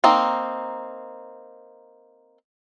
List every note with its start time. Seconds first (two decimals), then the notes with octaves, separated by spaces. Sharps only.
0.04 A#3 C4 D#4